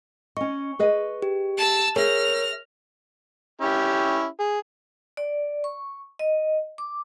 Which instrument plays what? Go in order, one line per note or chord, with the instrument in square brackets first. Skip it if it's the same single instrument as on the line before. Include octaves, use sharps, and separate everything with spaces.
[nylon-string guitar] C#4 D#5 [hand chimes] C#6
[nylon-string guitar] G#4 B4 D#5
[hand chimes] G4
[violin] A5 E6
[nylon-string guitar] G#4 E5 [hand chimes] A#4 C#5 [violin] F6 A#6
[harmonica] C#4 E4 G4
G#4
[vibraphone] D5
C#6
D#5
D6